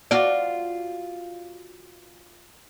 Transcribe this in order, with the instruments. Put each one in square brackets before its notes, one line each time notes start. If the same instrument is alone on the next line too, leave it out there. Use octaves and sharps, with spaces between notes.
[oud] F4 F#4 D5